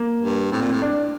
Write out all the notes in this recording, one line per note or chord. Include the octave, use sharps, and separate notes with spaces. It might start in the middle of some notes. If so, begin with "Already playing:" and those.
Already playing: A#3
G2
A2 C4
A#2
A2
D4